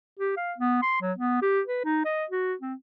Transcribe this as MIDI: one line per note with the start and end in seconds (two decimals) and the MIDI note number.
0.19 0.32 67
0.37 0.53 77
0.58 0.78 59
0.82 1.00 84
1.01 1.12 54
1.18 1.41 59
1.42 1.61 67
1.66 1.83 71
1.85 2.03 63
2.05 2.25 75
2.31 2.54 66
2.61 2.74 60